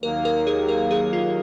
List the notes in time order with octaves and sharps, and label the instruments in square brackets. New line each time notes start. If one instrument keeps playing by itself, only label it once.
[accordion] D#2 D#3 F#3 A#3 [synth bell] A#4
[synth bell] A#4
G#4
A#4
G#4
F4